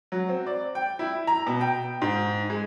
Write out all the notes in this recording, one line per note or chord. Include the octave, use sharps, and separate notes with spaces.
F#3
C4
D5
G5
E4
A#5
B2
G5
G#2
G#3